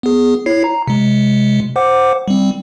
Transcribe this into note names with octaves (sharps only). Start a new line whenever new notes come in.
B3 G#4
E4 C#5 C7
A#5
C3 G#3
C5 F#5 D6
G3 C4